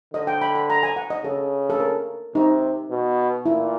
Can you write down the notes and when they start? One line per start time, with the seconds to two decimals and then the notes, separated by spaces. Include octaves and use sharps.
0.14 D3 D#5
0.27 G5
0.42 B5
0.55 B5
0.70 A#5
0.83 G#5
0.96 F#5
1.10 D#5
1.24 C#3 A4
1.70 A4
1.80 A#4
2.35 C3 D#4
2.90 B2
3.46 A#2 E4